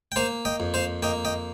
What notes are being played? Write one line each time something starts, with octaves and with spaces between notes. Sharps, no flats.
G5
A#3 C5 F5
D#5 G5
F2
C5 F5
A#3 D#5 G5
D#5 G5